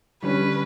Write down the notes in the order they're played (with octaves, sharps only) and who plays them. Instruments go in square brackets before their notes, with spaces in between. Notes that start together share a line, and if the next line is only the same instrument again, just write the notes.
[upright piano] D3 G3 C#4 [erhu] B4